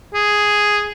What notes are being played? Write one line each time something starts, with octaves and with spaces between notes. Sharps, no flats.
G#4